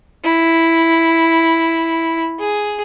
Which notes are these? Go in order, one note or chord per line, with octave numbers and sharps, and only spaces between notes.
E4
G#4